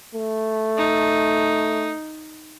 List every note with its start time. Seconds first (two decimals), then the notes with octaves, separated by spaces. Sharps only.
0.14 A3
0.77 D#4